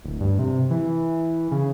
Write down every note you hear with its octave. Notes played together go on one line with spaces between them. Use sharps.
D1
G2
C3
E3
C#3